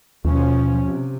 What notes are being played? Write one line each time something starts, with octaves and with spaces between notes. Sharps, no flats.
D#2 B2 F3 C#4
C3